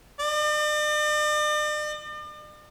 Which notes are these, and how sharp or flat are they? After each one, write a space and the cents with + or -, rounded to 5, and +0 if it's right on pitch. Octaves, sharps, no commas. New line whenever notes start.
D5 +45